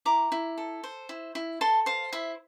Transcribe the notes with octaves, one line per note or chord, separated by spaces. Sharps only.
E4 A#5 D6
E4
A4
C5
E4
E4
A4 A5 C6
C5 F5
E4 E5